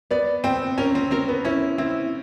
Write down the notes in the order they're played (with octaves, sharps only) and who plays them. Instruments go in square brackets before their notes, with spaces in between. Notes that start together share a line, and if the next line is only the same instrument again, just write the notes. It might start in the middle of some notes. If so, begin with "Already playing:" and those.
[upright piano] B3 [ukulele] D5
[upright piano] C4 [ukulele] G5
[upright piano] C#4 [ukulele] A#4
[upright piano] C4
[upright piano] C4 [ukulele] A#4
[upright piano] B3
[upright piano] C#4 [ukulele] E4
[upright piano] C4 [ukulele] E4